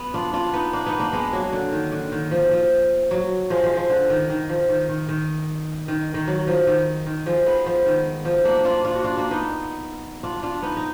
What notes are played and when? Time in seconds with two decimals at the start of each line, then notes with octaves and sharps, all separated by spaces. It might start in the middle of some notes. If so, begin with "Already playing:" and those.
Already playing: B3
0.14 D4 F4
0.33 D4 F4
0.53 B3 D#4
0.73 A#3 D4
0.86 B3 D#4
0.99 A#3 D4
1.13 G#3 B3
1.33 F#3 A#3
1.53 D3
1.72 D#3
1.92 D3
2.12 D#3
2.31 F3
2.51 F3
3.11 F#3
3.50 F3 G#3
3.63 F3 G#3
3.77 F3
3.90 D3
4.10 D#3
4.30 D#3
4.49 F3
4.69 D#3
4.89 D#3
5.09 D#3
5.88 D#3
6.14 D#3
6.28 F#3
6.47 F3
6.67 D#3
7.06 D#3
7.26 F3 G#3
7.46 G#3 B3
7.66 F3
7.86 D#3
8.25 F3
8.45 A#3 D4
8.65 D4 F4
8.84 D4 F4
8.95 F#4
9.04 D4 F4
9.18 A#3 D4
9.31 B3 D#4
10.23 D4 F4
10.43 D4 F4
10.62 B3 D#4
10.77 D#4